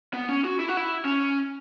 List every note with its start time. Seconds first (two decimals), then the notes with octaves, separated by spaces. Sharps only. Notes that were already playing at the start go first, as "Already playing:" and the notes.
0.14 B3
0.29 C#4
0.44 F#4
0.60 E4
0.68 F#4
0.77 E4
1.05 C#4